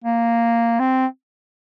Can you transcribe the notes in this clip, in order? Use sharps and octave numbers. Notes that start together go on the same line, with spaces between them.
A#3
C4